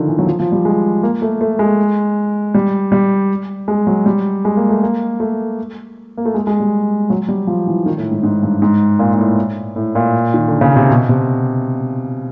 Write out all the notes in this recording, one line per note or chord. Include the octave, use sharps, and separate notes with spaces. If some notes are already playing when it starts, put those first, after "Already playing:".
Already playing: D3 D#3 F3
E3
F#3
F3
F3
G3
G#3
A#3
A3
A3
G#3
G3
G3
G#3
F#3
G3
G#3
A#3
A3
A#3
A3
A#3
A3
G#3
G#3
G3
F#3
G3
F3
E3
D#3
A2
G#2
G#2
G2
G#2
A#2
A#2
A2
A2
A#2
D#3
D3
C#3
C3
B2
C3